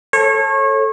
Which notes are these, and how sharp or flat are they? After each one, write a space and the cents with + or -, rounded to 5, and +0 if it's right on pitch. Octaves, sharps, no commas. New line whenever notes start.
A4 +0 C#5 -30